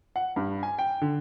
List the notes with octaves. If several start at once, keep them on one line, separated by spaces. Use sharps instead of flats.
F#5
G2
G#5
G5
D3